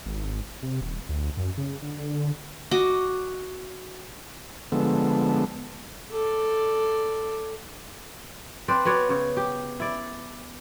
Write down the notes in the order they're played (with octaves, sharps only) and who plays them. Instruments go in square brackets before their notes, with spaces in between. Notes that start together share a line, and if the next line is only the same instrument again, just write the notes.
[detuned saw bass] G#1
C3
D#1
D2
F#2
C#3
D3
[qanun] F#4 D#5 D6
[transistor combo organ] D3 F3 G#3 B3 A4
[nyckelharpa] A4 D5
[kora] C4 B4 C5 D5
B3 F#4 C#5 D5
C#3 C#5
G4
E4 D5